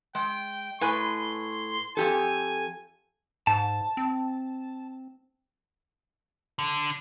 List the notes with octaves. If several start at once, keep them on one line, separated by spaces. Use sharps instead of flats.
G#3 G5
A2 B4 G#5 C6
F2 G4 A4 G#5
G#2 A5
C4
D3